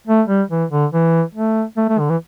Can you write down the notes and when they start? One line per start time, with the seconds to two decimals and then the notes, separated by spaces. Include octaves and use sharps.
0.07 A3
0.27 G3
0.50 E3
0.71 D3
0.92 E3
1.34 A3
1.77 A3
1.88 A3
1.99 D3
2.10 E3